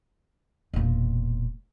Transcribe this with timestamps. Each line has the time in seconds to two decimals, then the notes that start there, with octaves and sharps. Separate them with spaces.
0.73 E1 A#2